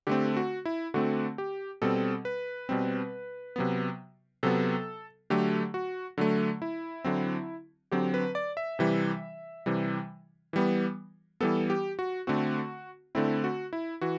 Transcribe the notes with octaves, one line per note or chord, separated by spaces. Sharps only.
D3 A3 C4 G4
F#4
E4
D3 A3 C4 F#4
G4
B2 G3 C4 A4
B4
B2 G3 C4
C3 F#3 B3
C3 F#3 B3 A4
D3 F#3 A3 G4
F#4
D3 F#3 A3
E4
D3 F#3 C4
D3 F#3 C4 G4
B4
D5
E5
C3 E3 G3
C3 E3 G3
E3 G3 B3
E3 G3 B3 A4
G4
F#4
D3 A3 C4 F#4
D3 A3 C4 E4
F#4
E4
E3 F#4